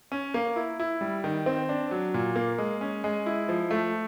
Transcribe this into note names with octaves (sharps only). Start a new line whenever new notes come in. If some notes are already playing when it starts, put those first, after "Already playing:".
C#4
A#3
E4
E4
G3
D#3
C4
D4
F#3
A#2
A#3
G#3
C#4
G#3
E4
F3
A3